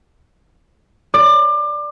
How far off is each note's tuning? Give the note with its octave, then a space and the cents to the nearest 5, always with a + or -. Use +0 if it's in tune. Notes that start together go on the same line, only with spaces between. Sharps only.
D5 +0 D6 +30